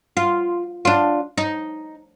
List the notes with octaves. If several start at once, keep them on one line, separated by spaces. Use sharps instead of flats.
F4
D4 F4
D#4